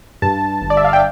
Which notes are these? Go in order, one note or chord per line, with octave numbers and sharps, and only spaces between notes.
G2 A5
G1
D5
E5
F5
G5